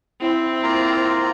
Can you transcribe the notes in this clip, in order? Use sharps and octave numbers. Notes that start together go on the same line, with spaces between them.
C4 E4
A#3 F4 A#5